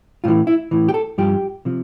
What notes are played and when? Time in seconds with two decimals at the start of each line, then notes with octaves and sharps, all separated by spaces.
0.24 A2 E3 F4
0.47 E4
0.71 A2 E3
0.89 G4
0.94 A4
1.18 G2 F3 G4
1.65 C3 F3